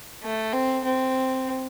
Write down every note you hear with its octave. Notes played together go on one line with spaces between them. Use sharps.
A3
C4
C4